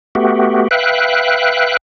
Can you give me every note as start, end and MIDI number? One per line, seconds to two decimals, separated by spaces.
0.15 0.68 57
0.15 0.68 59
0.15 0.68 66
0.15 0.68 67
0.71 1.77 71
0.71 1.77 76
0.71 1.77 77
0.71 1.77 79
0.71 1.77 90